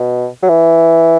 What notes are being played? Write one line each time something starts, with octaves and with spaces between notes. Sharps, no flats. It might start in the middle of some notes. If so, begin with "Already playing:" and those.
Already playing: B2
F#3
E3